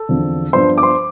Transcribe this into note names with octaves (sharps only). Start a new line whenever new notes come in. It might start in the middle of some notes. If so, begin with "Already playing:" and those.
Already playing: A4
E2 D3 F3 C4
G2 F3 B3 D4 C5 C6
D6
C5 C6